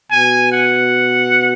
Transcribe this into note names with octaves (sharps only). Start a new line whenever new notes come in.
B2 G#5
F#5